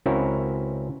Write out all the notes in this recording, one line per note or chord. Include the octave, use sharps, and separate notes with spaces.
C#2 C4 C#4 E4 F#4 A#4